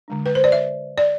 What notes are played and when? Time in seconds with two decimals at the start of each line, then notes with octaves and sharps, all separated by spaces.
0.08 D3 G#3 D4
0.26 B4
0.35 C5
0.44 D5
0.52 E5
0.98 D5